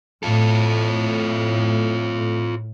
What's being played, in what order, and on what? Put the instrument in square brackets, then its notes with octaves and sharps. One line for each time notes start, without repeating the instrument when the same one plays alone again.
[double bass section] A2 [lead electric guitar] F4 A4